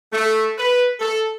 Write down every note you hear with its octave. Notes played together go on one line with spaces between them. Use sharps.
A3
B4
A4